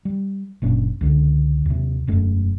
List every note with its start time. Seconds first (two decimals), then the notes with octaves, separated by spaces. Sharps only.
0.05 G3
0.62 F#1 A#2 C#4 D4
1.01 C#2 D3
1.66 D#2 C3
2.07 E1 F#2 A3